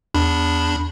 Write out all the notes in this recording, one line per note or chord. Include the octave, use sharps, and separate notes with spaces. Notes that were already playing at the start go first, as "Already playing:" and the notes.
E2 D4 B5